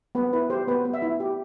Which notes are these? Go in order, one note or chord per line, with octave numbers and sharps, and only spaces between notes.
B3 B4
E4 B4
G4 C5
B3 B4
B3
E5
E4
G4